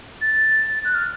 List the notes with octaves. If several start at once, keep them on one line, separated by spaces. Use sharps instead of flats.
A6
F#6
F6